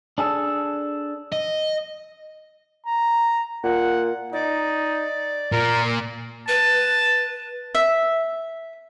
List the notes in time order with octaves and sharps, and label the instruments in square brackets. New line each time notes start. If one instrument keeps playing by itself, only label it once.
[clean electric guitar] D4 G#4 A4
[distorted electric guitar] D#5
[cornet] A#5
[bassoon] A#2 [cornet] F#5
[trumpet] D#4 [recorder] D5
[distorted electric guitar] A#2 [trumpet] A#4
[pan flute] B4 [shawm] A5
[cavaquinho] E5